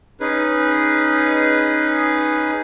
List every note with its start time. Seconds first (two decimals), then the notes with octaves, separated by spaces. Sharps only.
0.20 C#4 D#4 G#4 B4